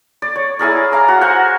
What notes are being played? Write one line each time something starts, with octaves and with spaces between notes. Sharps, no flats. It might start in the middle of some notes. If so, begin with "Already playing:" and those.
D5
C#5
E4 G#4 A#4 D5
F5 A#5 D6
F#4
A#4 C5 F#5 G#5